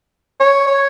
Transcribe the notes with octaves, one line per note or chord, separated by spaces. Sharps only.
C#5
C#5